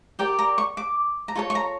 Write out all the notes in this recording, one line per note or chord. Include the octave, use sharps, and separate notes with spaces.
G4 A#4 D5 G5
A#5
C#6
D6
A#5
F4 A4 C#5 C#6
C#6
A#5